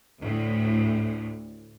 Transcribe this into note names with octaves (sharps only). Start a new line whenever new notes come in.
D2 A2